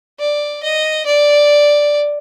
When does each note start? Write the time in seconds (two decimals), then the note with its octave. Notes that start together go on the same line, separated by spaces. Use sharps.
0.20 D5
0.63 D#5
1.06 D5